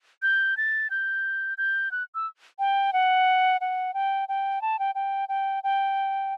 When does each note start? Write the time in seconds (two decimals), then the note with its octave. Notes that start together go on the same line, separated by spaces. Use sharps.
0.22 G6
0.57 A6
0.90 G6
1.58 G6
1.91 F#6
2.15 E6
2.59 G5
2.93 F#5
3.61 F#5
3.94 G5
4.29 G5
4.62 A5
4.79 G5
4.95 G5
5.29 G5
5.64 G5